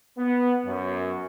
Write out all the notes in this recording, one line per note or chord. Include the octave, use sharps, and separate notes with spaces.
B3
F#2